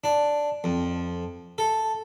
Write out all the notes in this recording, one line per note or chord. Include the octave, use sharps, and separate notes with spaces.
D4
F2
A4